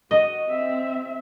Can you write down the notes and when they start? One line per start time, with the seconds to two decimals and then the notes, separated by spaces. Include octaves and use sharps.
0.11 F#4 D#5
0.49 C4 E5